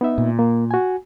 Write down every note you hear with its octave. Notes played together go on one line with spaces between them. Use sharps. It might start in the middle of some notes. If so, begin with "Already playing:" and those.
B3 D#4 E5
A#2
A#3
F#4 G#5